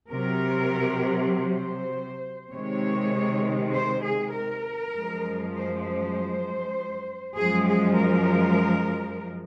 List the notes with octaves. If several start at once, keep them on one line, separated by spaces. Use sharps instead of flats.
C3 F#3 A#4
C5
C3 D#3 G#3 C#5
C5
G#4
A#4
F#2 F3 G#3
C5
C5
F#2 F3 G#3 G#4
G#4
A#4